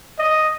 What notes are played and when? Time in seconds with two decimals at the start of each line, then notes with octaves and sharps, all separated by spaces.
0.19 D#5